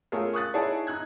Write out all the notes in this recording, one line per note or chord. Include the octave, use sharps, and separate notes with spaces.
A3 C#4 F4 G#4 A#4
C#6 D#6 F#6 A6
D#4 E4 G#4 A4 C#5 D5
D#4 F#6 G#6